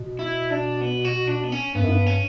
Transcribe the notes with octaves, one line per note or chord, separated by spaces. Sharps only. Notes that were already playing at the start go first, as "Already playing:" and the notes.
Already playing: B2
E4
D4
B3
F#4
D4
B3
C#4
G2 B3
F#2
G2
C#4